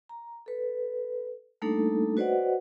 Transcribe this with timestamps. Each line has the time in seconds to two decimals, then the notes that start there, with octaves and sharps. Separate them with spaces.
0.09 A#5
0.46 A4 B4
1.62 G3 A3 A#3 D4 D#4 A4
2.17 F#4 B4 C5 D5 D#5 F#5